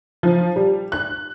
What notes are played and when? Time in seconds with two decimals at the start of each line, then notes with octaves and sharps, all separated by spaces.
0.23 F3
0.56 G3
0.92 F#6